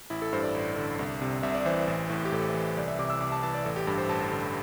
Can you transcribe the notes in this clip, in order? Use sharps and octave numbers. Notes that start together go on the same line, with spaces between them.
A1 E4
A4
G2 C5
D5
A1
D3
C2
C3
C2 E5
D5
E3 C5
A1
A2
G4
A1 A4
E3
C2 D5
E5
C3 D6
E6
C2 D6
A5
E3 A5
D5
A1 A4
G4
G2 A4
C5
A1 A5
D3